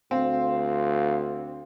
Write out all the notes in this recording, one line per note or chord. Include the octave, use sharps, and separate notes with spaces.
D2 C4 F5